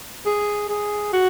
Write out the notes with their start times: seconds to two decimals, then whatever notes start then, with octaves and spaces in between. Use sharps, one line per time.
0.26 G#4
0.69 G#4
1.13 F#4